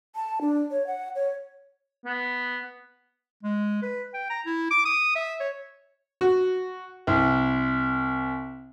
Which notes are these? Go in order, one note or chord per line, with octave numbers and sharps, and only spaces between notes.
A5
D4
C#5
F#5
C#5
B3
G#3
B4
G5
A#5
E4
D6
D#6
E5
C#5
F#4
C2